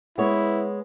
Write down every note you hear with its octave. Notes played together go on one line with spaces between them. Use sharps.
G#3 B3 E4 C#5